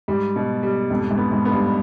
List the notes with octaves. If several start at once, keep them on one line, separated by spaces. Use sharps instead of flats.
G#2 G3
B2
G3
F2 G#2
G#2
B3
G#2
B3
G2